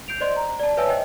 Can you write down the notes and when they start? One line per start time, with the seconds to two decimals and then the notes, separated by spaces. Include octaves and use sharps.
0.08 G6 C7 D7 F7
0.21 C5 D5 D#5 C6
0.36 A#5
0.60 D5 A5
0.77 B4 C#5 E5 G#5 A5 E6
0.89 C5 D#5 E5 G5